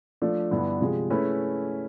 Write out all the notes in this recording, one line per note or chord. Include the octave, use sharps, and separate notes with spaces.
F3 A3 D4
G2 D3 G3 B3 E4
C3 F3 G#3
A3 C#4 E4 G#4 B4